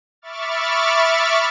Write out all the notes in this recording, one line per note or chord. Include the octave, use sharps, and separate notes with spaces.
E5 B5 C#6 D6 F6 A6